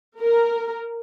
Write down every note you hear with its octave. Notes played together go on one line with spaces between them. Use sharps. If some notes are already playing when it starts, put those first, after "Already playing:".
A#4